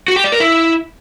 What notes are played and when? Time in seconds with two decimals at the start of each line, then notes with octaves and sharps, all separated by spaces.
0.08 F#4
0.16 G4
0.24 D5
0.32 A#4
0.40 E4